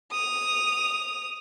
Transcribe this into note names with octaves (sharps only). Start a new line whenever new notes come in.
D#6 F7